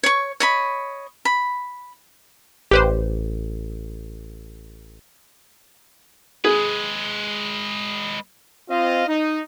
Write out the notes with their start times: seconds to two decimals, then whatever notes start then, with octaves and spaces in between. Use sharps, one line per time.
0.04 C#5 C#6
0.40 C#5 D#5 B5
1.25 B5
2.71 A1 G4 B4 C5
6.45 G#3 G#4 B4
8.70 C4 F4 D#5 F5
9.08 D#4